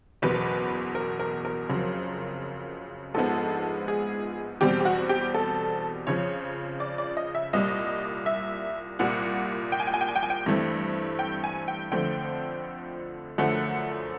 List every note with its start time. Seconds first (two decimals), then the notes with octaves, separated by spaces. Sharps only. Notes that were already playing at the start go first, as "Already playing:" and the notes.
0.22 F#1 E2 B2 B4
0.95 A#4
1.19 A#4
1.45 A#4
1.68 F#1 F2 C#3 F#3
3.14 A#1 G#2 F3 G#3 B3 A4
3.88 G#4
4.61 E2 B2 G3 C4 G4
4.80 G4
4.85 F#4
5.09 G4
5.34 A4
6.07 F2 C#3 F3 C#5
6.80 D5
6.98 D5
7.17 D#5
7.35 E5
7.53 C2 A#2 G3 D#5
8.26 E5
8.99 C2 A#2 G3 F#5
9.72 G5
9.80 G#5
9.87 G5
9.94 G#5
10.01 G5
10.08 G#5
10.16 G5
10.23 G#5
10.30 G5
10.46 G2 E3 A3 C4
11.19 G5
11.44 G#5
11.68 G5
11.92 F2 D3 F3 A3 C4 G5
13.38 F#2 D3 F3 A3 F#5